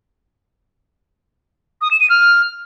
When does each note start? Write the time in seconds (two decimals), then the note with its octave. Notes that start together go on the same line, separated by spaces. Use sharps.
1.82 D#6
1.91 E7
2.00 D#7
2.10 F6